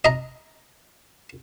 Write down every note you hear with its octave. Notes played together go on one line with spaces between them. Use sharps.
D#5 A#5